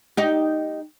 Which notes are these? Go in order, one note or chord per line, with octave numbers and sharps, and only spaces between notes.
D#4 G4